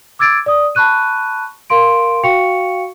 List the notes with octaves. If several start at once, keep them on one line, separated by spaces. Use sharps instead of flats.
D6 E6 G#6 A6 D7
D5 D#6
A5 B5 C#6 F#6 D#7
A#4 F5 C6 D7
F#4 F5 G5 C#6 C#7 F7